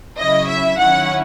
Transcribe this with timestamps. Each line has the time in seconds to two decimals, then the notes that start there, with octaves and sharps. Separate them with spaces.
0.18 C#3 F#3 C#4 E4 D#5
0.49 E5
0.79 D#3 F#3 C#4 E4 F#5